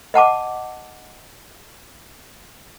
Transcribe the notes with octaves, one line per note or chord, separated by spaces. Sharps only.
D#5 F#5 A5 D6